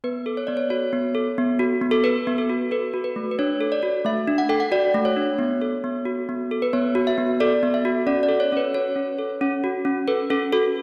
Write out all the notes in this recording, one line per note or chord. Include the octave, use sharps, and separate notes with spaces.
B3 B4
A4
C#5
B3 D5
C#5
F#4 C#5
B3
A4
B3
F#4
B3
A4
A4 B4
B3
A4
F#4
A4 B4
F#4
B4
A3
B4
D4 C#5
A4
D5
F#4
A3 E5
D4
F#5
A4 G5
F#5
F#4 D5
A3
C#5
D4
B3
A4
B3
F#4
B3
A4
B4
B3 C#5
F#4
E5
B3
A4 D5
B3
E5
F#4
C#4 D5
D5
A4
C#5
C#4 B4
F#4 C#5
C#4
A4
C#4
F#4
C#4
A4 B4
C#4 A4
F#4 A4